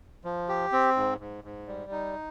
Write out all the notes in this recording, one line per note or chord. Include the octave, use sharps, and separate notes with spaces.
F3
G4
C4
G#2
G#2
G#2
G3
D#4